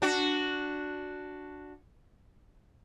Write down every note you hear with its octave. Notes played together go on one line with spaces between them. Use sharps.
D4 F#4